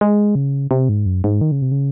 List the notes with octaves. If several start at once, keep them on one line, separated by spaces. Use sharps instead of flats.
G#3
C#3
C3
G#2
F#2
G#2
D#3
C#3
C3
C#3